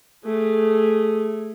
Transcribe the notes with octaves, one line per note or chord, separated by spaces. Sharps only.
A3 G#4